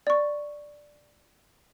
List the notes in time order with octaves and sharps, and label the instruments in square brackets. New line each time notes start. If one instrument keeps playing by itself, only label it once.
[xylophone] D5 C#6